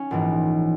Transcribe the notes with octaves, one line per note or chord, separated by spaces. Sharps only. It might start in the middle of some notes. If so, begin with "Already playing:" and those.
Already playing: C#4
A#1 G#2 E3